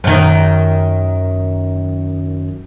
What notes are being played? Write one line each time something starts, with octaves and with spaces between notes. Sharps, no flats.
F#2 D#3